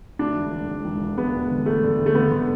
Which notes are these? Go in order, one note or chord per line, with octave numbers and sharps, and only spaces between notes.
D2 D4
E1
E1
E1
E1
E1
E1 B3
E1
D3
E1 A3
D3
E1
A3
D3 B3
D3